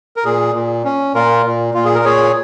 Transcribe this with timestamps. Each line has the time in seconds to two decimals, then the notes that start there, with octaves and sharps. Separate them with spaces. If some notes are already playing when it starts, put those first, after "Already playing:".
0.16 A#4
0.25 A#2 G#4
0.55 A#2
0.85 C#4
1.15 A#2 F4 A#4
1.45 A#2
1.74 A#2 F4
1.85 G#4
1.95 A#4
2.05 A#2 G#4 C#5